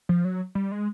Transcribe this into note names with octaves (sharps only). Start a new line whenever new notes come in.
F3
F#3
G3
G#3